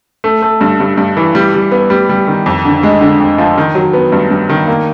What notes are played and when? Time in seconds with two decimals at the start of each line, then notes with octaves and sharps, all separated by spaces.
0.24 A3
0.42 A3
0.61 G2
0.80 G2
0.98 G2
1.17 E3
1.35 G3
1.54 G3
1.71 B3
1.90 G3
2.09 G3
2.27 D#3
2.46 F2
2.65 D3
2.83 G#3
3.01 D3
3.20 F2
3.38 F3
3.58 D#3
3.75 F#3
3.93 B3
4.12 G2
4.31 G2
4.50 D#3
4.68 A#3